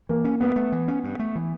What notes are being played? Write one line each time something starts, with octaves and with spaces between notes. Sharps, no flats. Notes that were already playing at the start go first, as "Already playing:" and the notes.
E3 A#3
C#4
G2 B3
A3
E3
C#4
G2
A3
E3